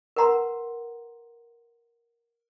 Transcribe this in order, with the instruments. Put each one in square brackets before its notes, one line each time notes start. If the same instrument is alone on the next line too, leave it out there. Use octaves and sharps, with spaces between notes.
[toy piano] A#4 B4 F#5 A#5 C6